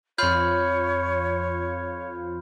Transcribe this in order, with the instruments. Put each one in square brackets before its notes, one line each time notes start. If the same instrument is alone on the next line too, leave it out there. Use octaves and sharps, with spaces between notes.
[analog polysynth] F2 F4 [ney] C#5 [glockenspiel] B5 F6 G6